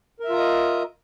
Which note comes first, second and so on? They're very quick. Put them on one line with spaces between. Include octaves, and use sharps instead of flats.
A#4 E5 F4 A#5 D#5